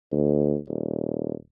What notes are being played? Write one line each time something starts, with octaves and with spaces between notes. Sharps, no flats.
D2
D#1